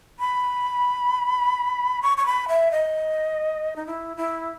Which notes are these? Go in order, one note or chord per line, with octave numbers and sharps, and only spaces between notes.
B5
C#6
C#6
B5
E5
D#5
D#4
E4
E4